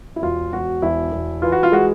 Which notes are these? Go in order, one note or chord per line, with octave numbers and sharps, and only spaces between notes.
E4
E1 F4
E1 F#4
E1 E4
E1
E3 F4
F#4
F4
G#3 F#4